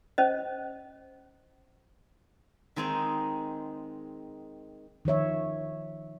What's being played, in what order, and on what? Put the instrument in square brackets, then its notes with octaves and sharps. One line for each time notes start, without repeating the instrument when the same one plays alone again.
[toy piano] C#4 C5 D#5
[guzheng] D#3 G#3 C4 D#4 G#4
[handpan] D#3 F3 C#5 E5